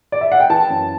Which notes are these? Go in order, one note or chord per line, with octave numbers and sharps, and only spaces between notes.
D5
E5
F#5
G5
E3 A5
F#2